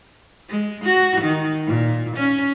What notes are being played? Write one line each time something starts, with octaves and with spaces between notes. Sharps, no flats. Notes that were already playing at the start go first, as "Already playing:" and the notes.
G#3
F#4
D#3
A#2
C#4